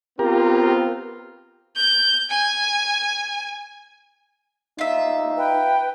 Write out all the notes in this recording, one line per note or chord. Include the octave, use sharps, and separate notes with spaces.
B3 C4 F4 G4 A#4
G6
G#5
D#4 F4 E5
B4 G5